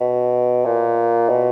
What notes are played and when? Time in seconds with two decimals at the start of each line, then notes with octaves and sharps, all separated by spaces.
0.01 B2
0.65 A#2
1.29 B2